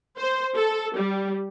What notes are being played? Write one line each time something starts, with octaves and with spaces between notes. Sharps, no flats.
C5
A4
G3